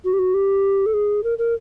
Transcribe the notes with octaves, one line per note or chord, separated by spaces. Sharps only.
F#4
G4
F#4
G4
A4
G#4
A#4
A#4